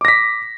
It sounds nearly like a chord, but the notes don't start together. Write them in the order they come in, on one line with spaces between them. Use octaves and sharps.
D6 A#6 B6